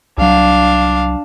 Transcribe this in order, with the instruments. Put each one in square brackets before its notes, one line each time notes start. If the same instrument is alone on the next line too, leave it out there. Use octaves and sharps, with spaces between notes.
[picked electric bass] C2 F#3 [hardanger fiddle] D4 F5